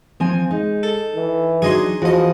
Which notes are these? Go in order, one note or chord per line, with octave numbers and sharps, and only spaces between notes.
F3 C4 G#5
G#3 D#4
A4
E3
F#3 D4 D#4 G#4 D#5 C6
E2 F3 F#4 D#5